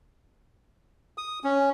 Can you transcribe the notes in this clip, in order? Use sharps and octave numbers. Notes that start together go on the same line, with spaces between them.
D#6
C#4